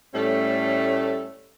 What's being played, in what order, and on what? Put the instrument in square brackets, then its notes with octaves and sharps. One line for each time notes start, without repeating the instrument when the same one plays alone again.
[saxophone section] A2 G3 A3 C#4 A4